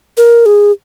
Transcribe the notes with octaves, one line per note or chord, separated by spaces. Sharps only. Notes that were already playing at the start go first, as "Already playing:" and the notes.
A#4
G#4